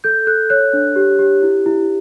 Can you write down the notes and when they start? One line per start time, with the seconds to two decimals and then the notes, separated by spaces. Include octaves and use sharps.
0.04 A4 G6
0.27 A4 F#6
0.50 C#5 F#6
0.73 D4
0.96 G4
1.19 G4
1.42 E4
1.66 E4